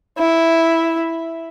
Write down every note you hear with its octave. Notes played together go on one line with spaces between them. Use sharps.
E4